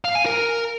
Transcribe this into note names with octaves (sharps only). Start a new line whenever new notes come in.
F5
G#5
A#4